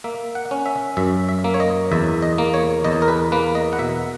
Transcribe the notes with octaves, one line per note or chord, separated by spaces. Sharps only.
A#3 E5
F#5
C#4
E5
F#2 E5
E5
A#3
C#5
D#5
E2 E5
D#5
A#3
C#5
E2 D#5
A#4
B4
A#3 B4
D#5
F#5
B2 E5